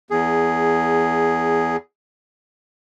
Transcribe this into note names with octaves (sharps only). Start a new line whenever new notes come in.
E2 G#4